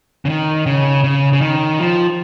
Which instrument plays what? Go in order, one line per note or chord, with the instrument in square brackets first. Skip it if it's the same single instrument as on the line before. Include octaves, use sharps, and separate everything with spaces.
[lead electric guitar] C#3
D#3
C#3
C#3
C#3
D#3
F3